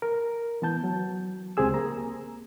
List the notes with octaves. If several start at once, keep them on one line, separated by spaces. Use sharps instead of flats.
A#4
E3 B3 A5 G6
F#3
C#2 C4 G4 G#4 E6
A#3 A#5